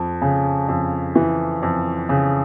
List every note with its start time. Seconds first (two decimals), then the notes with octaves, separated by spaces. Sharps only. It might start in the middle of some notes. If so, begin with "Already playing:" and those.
Already playing: F2
0.22 C#3
0.68 F2
1.15 E3
1.62 F2
2.09 C#3